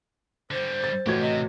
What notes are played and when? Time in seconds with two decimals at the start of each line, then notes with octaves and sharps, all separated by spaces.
0.51 D3 G3 C5
0.84 A6
1.06 A1 F3 F#4 G4 G#6
1.22 C3 D#5